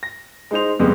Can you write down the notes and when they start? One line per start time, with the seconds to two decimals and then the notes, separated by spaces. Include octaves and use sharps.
0.03 A#6
0.51 G#3 D#4 C5 F7
0.80 F2 C#3 G3 G#3 B3